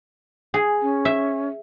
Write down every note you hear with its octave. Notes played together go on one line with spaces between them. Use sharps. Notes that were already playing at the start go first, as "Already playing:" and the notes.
G#4
C#4
E5